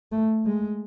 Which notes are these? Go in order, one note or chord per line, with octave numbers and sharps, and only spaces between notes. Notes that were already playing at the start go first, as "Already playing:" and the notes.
A3
G#3